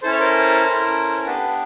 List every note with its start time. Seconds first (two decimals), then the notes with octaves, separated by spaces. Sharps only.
0.02 C#4 E4 A4 C5
0.11 C#5
0.20 A#4 C5
0.65 C#4 E4 A4
1.21 A#4
1.25 B3 D4 G4 A4 B4